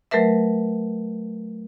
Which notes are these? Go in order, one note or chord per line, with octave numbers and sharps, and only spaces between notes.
F#3 A3 A#4 B4 E5